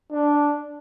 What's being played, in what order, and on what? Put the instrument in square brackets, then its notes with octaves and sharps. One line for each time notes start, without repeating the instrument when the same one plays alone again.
[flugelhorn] D4